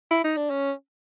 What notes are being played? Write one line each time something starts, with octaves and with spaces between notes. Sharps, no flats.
E4
D#4
D4
C#4